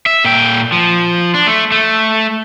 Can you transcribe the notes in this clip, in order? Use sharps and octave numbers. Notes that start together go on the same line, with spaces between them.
E5
A#2 G5
F3
D4
A3
A3